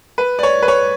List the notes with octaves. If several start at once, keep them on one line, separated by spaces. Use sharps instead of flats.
B4
D5
C#5
B4
C#5